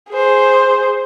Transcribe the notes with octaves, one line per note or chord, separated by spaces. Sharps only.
G#4 C5